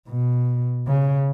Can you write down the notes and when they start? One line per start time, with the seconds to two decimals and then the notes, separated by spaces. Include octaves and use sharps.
0.09 B2
0.87 C#3